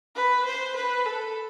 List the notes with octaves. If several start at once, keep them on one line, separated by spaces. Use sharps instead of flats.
B4
C5
B4
A4